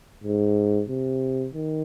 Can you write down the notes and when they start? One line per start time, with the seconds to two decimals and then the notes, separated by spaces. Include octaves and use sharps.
0.24 G#2
0.89 C3
1.54 D#3